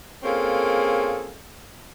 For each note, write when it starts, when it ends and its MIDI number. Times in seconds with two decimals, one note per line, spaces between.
0.23 1.34 58
0.23 1.34 60
0.23 1.34 61
0.23 1.34 65
0.23 1.34 68
0.23 1.34 69